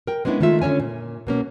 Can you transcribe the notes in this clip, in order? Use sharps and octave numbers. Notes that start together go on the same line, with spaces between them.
A#4 G5
G#3 B3 C#4 D4 E4
D#3 G#3 A3 F4 E5
D3 C#4 C#5 G#5
A#2
B2 A#3 C#4